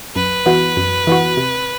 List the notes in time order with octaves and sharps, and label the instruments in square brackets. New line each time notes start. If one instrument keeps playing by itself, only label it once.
[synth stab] F#2 [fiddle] B4
[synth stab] E3 B3 F#4
F#2
E3 B3 F#4
C3